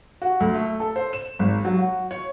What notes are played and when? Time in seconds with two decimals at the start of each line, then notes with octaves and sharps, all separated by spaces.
0.22 F#4
0.40 D2
0.54 A3
0.80 A4
0.96 C5
1.13 E7
1.39 G#1
1.65 F#3
1.78 F#4
2.11 C#5